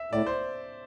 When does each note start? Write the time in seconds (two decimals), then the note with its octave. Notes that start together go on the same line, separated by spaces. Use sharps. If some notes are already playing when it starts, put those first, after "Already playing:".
Already playing: E5
0.12 A2 D5
0.26 C5